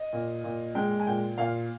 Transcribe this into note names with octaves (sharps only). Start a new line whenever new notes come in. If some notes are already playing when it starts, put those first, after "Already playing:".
Already playing: D#5
A#2
A#2
G#3 G5
G#5
A#2 G5
A#2 F5